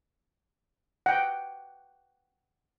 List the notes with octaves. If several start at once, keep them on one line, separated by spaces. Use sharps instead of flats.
F#5 G5